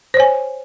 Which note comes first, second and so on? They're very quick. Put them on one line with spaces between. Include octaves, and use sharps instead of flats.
C5 C#5 G#5